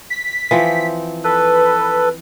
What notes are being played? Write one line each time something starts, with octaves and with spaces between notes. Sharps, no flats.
B6
E3 F3 C4
A4 B4